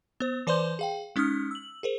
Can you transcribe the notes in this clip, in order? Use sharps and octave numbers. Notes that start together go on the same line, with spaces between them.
B3 C5
E3 B4 C5 D5 C6 G6
G#4 F5 G5
G#3 C#4 D#4 D#6 F6
E6 F#7
G#4 A#4 C5